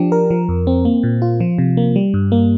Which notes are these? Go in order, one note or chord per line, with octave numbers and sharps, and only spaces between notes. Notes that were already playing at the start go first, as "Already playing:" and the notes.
Already playing: F3 D4 G4
A#4
F3
F2
C4
A#3
A#2
F4
F3
C3
A#3
G3
G2
A#3